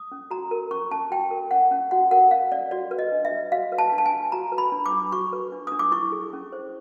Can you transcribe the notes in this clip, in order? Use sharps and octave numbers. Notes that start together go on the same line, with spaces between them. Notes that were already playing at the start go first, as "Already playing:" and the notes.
Already playing: D#6
C#4
F#4 A#5
A#4
C#4 C#6
C#4 A5
F#4 G5
A#4
C#4 F#5
C#4
F#4 F#5
A#4 F#5
C#4 F5
C#4 D5
F#4 D5
B4
D#5
D4
E5
D4
F#4 F5
B4
A5
D4
A5
G#5
D4
F#4 A#5
B4
B5
D4
D6
D4
F#4 C#6
B4
D4
D4 D#6
D6
E4 C#6
G#4
C#4
C5